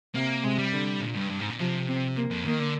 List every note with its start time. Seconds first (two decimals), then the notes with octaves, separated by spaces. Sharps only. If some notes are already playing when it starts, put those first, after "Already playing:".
0.14 C3 A#3
0.44 C3 G#3
0.58 G3
0.73 D3
1.01 A#2
1.16 G2
1.30 G2
1.40 G#2
1.50 A#2
1.59 C3 F3
1.88 C4
2.16 A#3
2.31 F2
2.45 D#3 A#3
2.59 D3